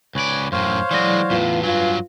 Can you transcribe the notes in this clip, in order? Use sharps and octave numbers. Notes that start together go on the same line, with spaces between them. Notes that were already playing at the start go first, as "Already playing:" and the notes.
C#2 B4 C#5 D5 G#5
F#2 A2 C5 C#5 F5
E3 F#3 G#3 E4 D5
E2 A2 F4 B4
G2 F#3 F4 G#5